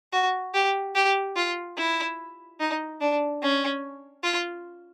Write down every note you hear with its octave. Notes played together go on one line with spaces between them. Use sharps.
F#4
G4
G4
F4
E4
D#4
D4
C#4
F4